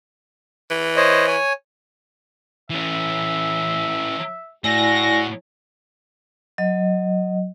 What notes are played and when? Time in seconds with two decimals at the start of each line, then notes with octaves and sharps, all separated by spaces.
0.70 E3
0.96 C5 C#5 D#5
1.28 C#5 G#5
2.70 E3 C#4 E5
4.64 A2 E4 F#4 D5 G#5 A#6
6.58 F#3 D#5